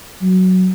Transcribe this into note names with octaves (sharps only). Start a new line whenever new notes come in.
F#3